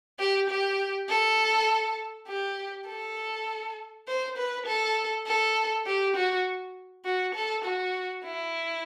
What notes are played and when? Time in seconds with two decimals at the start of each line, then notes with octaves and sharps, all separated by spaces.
0.19 G4
0.49 G4
1.09 A4
2.28 G4
2.88 A4
4.08 C5
4.37 B4
4.66 A4
5.27 A4
5.87 G4
6.16 F#4
7.05 F#4
7.35 A4
7.65 F#4
8.25 E4